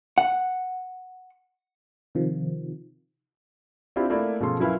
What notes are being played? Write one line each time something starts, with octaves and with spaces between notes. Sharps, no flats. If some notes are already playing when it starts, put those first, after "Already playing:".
F#5
C3 D#3 F3
C4 D4 E4 F4 G4
A3 A#3 E4 D5
B2 F3 G#3 C#4 A4 C6
F#3 C#4 E4 A#4 B4 F5